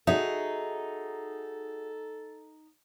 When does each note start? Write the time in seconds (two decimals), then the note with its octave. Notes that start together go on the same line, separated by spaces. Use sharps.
0.07 D#4 F#4 G#4 A4 E5 F#5